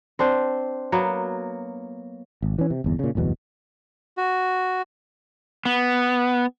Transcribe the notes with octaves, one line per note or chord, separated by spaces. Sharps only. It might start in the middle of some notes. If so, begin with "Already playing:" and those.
C4 D4 C5
F#3 A#3 B3
G#1
E3 C#4
C3
G1 E2
A#2 C#3
D1 G1 E2 B2
F#4
B3